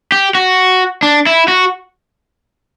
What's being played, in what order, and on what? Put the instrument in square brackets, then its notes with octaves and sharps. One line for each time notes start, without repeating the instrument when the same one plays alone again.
[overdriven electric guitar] G4
F#4
D4
E4
F#4